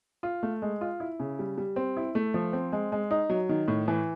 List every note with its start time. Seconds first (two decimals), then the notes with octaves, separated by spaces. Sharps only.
0.23 F4
0.43 A3
0.62 G#3
0.81 F4
1.00 E4
1.20 C#3
1.39 G3
1.58 G3
1.76 C4
1.97 E4
2.15 A3
2.34 F3
2.53 C4
2.72 G#3
2.92 G#3
3.11 D#4
3.30 F#3
3.49 D#3
3.68 A2
3.88 E3